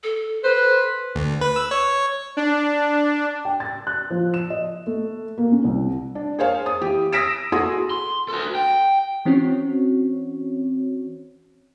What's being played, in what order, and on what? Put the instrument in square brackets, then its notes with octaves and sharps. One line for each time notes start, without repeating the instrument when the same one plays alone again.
[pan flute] A4
[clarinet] B4 [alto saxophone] C5
[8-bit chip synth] D2
B4
E6
C#5
[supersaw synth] D4
[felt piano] G5
A6
F#6
F3
E7
D#5
A3
A#3
C#4
C2
D4
G#4 A#4 C5 C#5 F5 G#5
D#6
E3 G4
D#6 E6 A#6 B6 D7 E7
E4 F#4 G#4 A4 C6 D#6
[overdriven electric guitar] C6
F#4 A4
G5
[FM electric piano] E3 C4 C#4 F#4 C#5